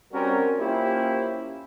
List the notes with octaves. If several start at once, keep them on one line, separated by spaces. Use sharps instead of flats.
G3 C4 C#4 F#4 A#4
A#3 C#4 E4 F4 G4 C5